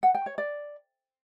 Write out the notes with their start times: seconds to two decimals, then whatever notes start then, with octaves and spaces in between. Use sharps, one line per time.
0.03 F#5
0.15 G5
0.26 C#5
0.38 D5